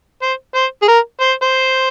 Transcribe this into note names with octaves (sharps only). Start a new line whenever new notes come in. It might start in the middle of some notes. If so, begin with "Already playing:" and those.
C5
C5
G#4
A#4
C5
C5